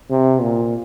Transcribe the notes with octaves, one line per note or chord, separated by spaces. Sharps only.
C3
A#2